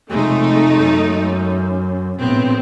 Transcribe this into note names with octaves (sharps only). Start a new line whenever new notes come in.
F1 G#3 A3 D#4
F#2
A#1 A2 B3 C4